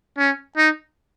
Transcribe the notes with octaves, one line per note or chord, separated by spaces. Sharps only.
C#4
D#4